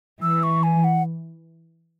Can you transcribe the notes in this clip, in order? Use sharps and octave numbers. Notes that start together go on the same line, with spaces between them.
E3 E6
C#6
G#5
F#5